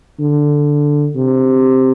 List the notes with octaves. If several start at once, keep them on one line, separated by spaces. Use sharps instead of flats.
D3
C3